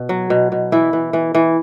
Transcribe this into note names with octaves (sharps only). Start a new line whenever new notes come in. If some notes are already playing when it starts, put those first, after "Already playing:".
Already playing: B2
F#3
B2
B2
E3 E4
E3
E3
E3